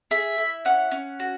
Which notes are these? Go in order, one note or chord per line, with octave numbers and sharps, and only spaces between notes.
G#4 E5
E4
C#4 F#5
C#4
F#4